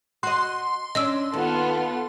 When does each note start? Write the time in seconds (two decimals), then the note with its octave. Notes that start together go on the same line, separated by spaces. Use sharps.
0.23 F#4 D#5 C6
0.95 C#4 D4 D#5 E6
1.33 D#2 B3 F4 A4